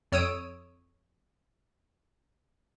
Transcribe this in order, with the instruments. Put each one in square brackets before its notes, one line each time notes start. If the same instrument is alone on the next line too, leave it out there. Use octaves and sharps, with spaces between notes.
[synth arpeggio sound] F2 C#5 D#6 E6 D7 D#7